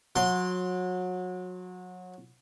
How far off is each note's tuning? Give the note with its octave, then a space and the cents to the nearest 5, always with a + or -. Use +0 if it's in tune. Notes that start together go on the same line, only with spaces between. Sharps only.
F#3 -25 C6 +0